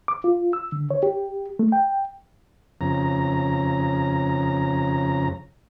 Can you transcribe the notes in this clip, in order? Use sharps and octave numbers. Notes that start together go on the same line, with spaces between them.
D6
F4
E6
D3
C#5
G4
A3
G5
F2 C#3 A#5